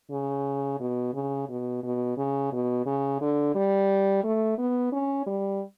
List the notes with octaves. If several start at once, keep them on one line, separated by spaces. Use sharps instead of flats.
C#3
B2
C#3
B2
B2
C#3
B2
C#3
D3
G3
A3
B3
C#4
G3